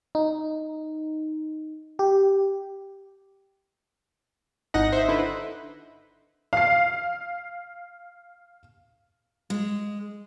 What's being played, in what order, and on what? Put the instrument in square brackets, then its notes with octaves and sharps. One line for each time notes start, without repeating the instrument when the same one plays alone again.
[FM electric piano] D#4
G4
[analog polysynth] G#1 F#5 A#6 [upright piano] D#4
[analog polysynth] C5 E5
D3 E4 B4
[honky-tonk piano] F5 C7
[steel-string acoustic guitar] G#3